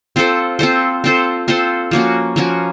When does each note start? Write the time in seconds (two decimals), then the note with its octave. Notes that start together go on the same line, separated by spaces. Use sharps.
0.16 C4 F4 A4 C5
0.59 C4 F4 A4 C5
1.04 C4 F4 A4 C5
1.48 C4 F4 A4 C5
1.91 F3 A#3 C#4 F#4
2.36 F3 A#3 C#4 F#4